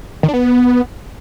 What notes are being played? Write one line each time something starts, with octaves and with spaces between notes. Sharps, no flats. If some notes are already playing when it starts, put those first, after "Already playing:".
D#3
D4
B3